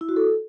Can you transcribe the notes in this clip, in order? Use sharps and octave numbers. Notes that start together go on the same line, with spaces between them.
E4
F#4
A4